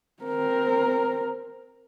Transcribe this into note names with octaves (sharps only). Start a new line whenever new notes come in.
C4 A#4